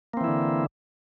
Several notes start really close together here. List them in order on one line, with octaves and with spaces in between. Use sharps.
A#3 C4 E3 E4 D3